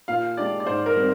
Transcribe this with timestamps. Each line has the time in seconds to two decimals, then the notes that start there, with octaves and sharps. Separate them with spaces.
0.08 A#2 F5
0.37 G#3 D4 G4 D5
0.60 D5
0.66 G#2 C5
0.86 A#4
0.96 G3 C4